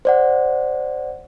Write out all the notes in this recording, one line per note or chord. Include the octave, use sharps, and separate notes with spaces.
C5 D5 F#5